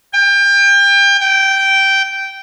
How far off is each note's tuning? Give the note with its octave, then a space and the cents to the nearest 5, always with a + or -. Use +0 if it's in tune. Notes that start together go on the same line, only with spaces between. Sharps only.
G5 +30
G5 -10